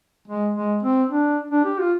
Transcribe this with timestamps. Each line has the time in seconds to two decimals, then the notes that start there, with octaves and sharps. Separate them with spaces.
0.28 G#3
0.55 G#3
0.83 C4
1.10 D4
1.51 D4
1.65 G4
1.79 F4